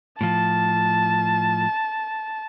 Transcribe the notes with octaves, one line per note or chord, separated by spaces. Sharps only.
A2 F3 A5